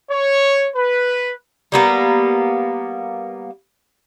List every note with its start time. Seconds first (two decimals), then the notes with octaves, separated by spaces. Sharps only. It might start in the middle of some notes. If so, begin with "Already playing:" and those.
0.11 C#5
0.76 B4
1.72 G3 A#3 B3